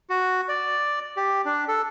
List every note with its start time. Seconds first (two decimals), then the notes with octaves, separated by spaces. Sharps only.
0.10 F#4
0.48 D5
1.17 G4
1.45 D4
1.68 A4